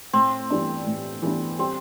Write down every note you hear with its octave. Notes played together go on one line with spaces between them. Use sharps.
A2 C4
E3 G3 B3 D4
A2
E3 G3 B3 D4
G3 C4